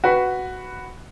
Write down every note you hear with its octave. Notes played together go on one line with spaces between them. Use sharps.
F#4 B4 B5